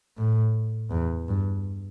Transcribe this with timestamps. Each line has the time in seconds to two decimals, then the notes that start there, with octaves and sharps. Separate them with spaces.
0.17 A2
0.90 E2
1.28 G2